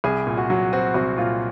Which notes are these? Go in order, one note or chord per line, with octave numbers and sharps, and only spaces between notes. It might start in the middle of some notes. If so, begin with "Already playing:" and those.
C2 G#4
A#2
F#4
F#3
C4 F#4
C2 F#4
A#2 F4